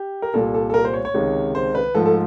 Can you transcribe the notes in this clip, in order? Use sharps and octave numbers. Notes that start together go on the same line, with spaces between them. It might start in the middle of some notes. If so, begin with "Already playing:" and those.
Already playing: G4
A#4
C2 A#2 G3 A4
A4
A4
A#4
C5
C#5
C#5
C#2 C3 D#3 G#3
C5
B4
G#2 F3 A3 A4
A4